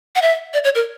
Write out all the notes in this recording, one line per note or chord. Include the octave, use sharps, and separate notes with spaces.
F#5
E5
D5
C#5
A#4